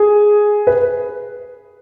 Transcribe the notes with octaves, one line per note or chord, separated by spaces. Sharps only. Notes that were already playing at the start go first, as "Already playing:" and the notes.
Already playing: G#4
B4